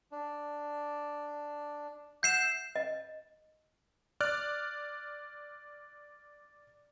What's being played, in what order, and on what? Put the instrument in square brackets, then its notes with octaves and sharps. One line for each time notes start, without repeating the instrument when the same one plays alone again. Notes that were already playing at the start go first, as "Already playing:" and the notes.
[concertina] D4
[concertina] E5 F#5 [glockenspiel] G6 C7 E7
[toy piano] D#5
[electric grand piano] D5 F6 F#6